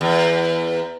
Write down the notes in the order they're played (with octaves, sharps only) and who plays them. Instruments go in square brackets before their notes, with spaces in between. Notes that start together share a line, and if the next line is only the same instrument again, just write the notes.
[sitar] E2